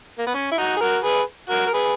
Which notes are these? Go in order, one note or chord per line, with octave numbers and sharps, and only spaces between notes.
A#3
B3
C#4
E4
D#4 F#4
G#4
F#4 A#4
G#4 B4
F#4 A#4
A#4
G#4 B4